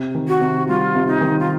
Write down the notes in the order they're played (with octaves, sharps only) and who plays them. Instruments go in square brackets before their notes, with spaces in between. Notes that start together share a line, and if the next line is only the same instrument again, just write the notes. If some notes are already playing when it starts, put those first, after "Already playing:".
Already playing: [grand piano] C3
D#3
[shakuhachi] F#4
[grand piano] C3
[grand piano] G3 [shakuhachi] F4
[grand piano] C3
[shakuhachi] D#4
[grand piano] D#3
[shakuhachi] F4